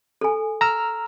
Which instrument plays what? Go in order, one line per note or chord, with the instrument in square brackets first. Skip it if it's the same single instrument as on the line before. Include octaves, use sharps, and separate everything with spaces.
[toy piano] A4 G#5
[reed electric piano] A#5 E6 F6